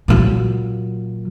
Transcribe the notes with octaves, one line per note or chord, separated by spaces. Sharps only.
A#2 F#3